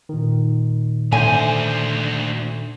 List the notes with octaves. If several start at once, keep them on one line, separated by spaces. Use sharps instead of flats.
A#2 D#3
D2 D3 C5 E5 G#5